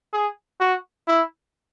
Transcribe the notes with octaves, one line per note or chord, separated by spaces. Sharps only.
G#4
F#4
E4